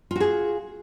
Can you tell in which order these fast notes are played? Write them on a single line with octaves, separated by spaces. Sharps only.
F4 F#4 G#4